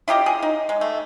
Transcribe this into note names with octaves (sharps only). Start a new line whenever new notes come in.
E4 F4 G4 D#5
G#4
D#4
G#3
A3